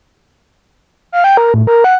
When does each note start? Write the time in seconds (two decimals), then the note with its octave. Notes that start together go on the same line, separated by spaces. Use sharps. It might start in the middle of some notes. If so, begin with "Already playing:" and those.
1.12 F5
1.24 G5
1.37 A#4
1.54 A2
1.67 A#4
1.84 F#5